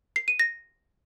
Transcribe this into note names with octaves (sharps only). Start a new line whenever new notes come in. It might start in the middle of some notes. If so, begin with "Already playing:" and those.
C7
D#7
A#6